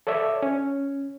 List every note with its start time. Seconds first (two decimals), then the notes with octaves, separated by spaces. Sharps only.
0.07 A4 C#5 D5 E5
0.42 C#4